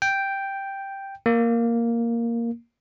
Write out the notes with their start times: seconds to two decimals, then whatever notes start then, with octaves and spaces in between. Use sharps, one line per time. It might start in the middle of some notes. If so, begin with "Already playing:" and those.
0.02 G5
1.26 A#3